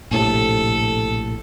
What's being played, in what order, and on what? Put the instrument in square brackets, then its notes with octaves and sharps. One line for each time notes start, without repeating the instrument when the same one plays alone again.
[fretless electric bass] A#1 A2 C3 [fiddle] A4